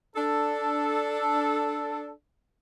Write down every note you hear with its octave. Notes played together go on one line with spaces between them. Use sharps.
D4 A4